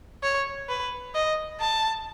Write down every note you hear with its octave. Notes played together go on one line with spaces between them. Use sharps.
C#5
B4
D#5
A5